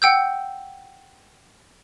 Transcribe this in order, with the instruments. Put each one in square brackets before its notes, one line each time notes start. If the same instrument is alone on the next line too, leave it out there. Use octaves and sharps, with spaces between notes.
[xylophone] F#5 G5 E6 G6